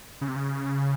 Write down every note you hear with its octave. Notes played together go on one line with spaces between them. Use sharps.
C#3
C3
C#3